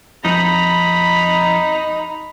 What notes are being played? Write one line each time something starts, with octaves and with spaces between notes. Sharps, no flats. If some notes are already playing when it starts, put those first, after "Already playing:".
F2 D#4 A#5 B5